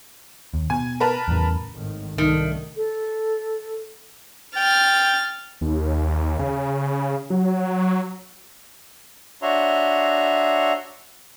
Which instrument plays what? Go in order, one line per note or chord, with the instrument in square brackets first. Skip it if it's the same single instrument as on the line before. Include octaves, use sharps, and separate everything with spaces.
[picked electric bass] D#2
[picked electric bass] B2 [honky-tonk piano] G#5
[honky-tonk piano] A#4 B4 A5
[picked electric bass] E2 A2 C#3
[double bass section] G#1 A2 D#3
[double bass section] C2 D3 A3 [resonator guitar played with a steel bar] D#3
[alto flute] A4
[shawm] G5 [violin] F6 A6
[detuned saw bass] D#2
C#3
F#3
[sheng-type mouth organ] D4 F#4 C#5 E5 A#5 C6